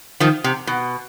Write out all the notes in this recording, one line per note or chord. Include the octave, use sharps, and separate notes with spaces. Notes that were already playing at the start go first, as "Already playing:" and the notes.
D#3 F3
C3
B2